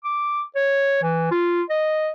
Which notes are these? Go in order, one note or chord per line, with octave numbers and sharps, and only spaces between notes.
D6
C#5
E3
F4
D#5